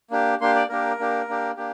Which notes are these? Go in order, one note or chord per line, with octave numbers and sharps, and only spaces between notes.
A#3 D4 G4
A#3 D4 G4 C6
D5
A#3 D4 G4 A#4
A#3 D4 G4
A#3 D4 G4
A#3 D4 G4